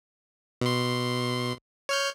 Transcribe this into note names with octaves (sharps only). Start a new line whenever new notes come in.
B2 C6
C#5 F6 G6